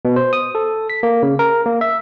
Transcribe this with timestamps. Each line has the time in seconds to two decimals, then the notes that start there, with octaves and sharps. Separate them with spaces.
0.05 B2
0.16 C5
0.33 D#6
0.55 A4
0.90 B6
1.03 A#3
1.23 C#3
1.39 A#4
1.66 A#3
1.81 E5